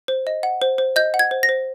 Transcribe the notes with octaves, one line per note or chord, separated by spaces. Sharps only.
C5
D#5
F#5
C5
C5
D#5 G6
F#5
G#6
C5
A#6
C5